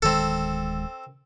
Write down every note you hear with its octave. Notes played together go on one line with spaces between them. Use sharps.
D1 D#3 G#3 C4 A4